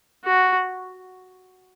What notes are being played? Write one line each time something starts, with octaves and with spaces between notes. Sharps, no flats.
F#4